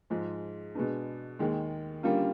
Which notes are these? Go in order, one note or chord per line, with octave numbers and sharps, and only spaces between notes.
G#2 F3 G#3
B2 G#3 B3 D4
D#2 D#3 G#3
D3 G3 A#3 C#4 F4